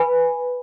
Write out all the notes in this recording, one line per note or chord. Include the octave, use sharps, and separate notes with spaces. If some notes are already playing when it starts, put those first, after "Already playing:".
Already playing: B4 G#5 B5